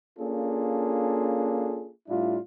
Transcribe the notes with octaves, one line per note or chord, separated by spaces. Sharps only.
A#3 C#4 D4 F4 G#4 A4
A2 G3 D4 E4 F4